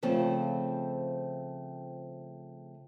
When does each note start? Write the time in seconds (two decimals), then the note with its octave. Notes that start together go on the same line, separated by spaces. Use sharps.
0.03 C#3 F3 A3 C4 A5